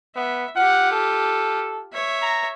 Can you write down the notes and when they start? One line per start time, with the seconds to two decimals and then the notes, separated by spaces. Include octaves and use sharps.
0.16 B3 E5
0.56 F4 G4 F#5
0.92 A4
1.93 C#5 E5
2.22 A#5